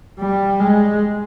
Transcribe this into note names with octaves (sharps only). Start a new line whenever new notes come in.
G3
G#3